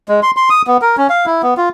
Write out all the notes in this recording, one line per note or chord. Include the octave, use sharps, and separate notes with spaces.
G#3
C6
C6
D#6
B3
A#4
C#4
F5
E4
B3
F4